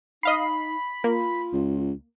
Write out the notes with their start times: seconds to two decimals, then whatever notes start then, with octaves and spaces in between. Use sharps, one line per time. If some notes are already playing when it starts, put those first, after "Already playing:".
0.23 D#4 D#5 F5 B5 C7
1.04 A#3 F4
1.53 C#2